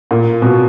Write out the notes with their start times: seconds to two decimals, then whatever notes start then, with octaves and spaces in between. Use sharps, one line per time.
0.11 A#2
0.42 B2